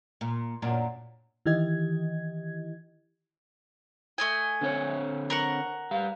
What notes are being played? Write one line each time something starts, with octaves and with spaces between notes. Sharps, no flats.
A#2
F#2 A#2 D4
D#3 E3 E4 G4 D#5 G#6
A3 D#5 G#5
D3 C4 C#5
A#4 F#5 C#6
G3 F5